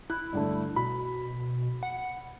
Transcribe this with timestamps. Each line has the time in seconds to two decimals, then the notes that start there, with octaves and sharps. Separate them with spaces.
0.10 E4 F#6
0.33 G2 D3 A3
0.76 B2 B5
1.83 F#5